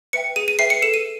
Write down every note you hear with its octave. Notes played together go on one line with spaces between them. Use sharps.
B4 E5 G5 C#7
G#4 D#7
D#7
B4 E5 G5 C7
C#7
A4 E7
D#7